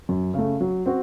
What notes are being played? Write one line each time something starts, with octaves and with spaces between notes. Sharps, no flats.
F#2
C#3 A3
F#3
C4 F#4